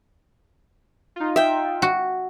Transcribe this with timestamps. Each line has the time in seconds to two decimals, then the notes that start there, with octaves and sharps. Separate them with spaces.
1.16 D#4 F4
1.36 E5 G5
1.82 F#4